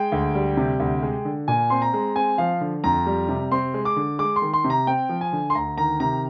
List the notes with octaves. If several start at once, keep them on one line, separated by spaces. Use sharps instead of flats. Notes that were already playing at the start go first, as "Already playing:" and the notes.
Already playing: G#3 G5
D2
G3
C3
D2
G#3
D3
A#2 G#5
C4 C6
A#5
G#3
C4 G#5
F3 F5
D3
F2 A#5
G3
C3
C4 C6
G#3
D6
D3
G#3 D6
C6
D#3
C6
C3
A#5
C4 G5
F3
G#5
D3
C6
D2 A#5
D#3 A#5
C3 A#5